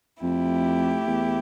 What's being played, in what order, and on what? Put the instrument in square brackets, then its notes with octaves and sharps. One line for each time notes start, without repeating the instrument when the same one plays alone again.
[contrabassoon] F2 [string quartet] A3 E4 G4
[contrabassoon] E2